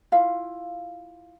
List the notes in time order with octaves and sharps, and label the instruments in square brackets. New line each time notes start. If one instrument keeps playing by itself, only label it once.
[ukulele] E4 F4 F5